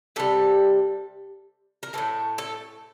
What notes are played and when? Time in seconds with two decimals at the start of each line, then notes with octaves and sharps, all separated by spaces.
0.16 C3 G3 A4
1.83 A#4
1.93 E3 A3 A4
1.98 A2
2.38 A4